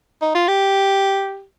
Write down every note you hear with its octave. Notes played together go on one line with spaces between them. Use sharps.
D#4
F4
G4